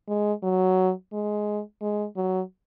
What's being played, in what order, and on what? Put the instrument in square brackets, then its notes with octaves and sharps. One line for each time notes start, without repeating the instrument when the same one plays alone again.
[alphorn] G#3
F#3
G#3
G#3
F#3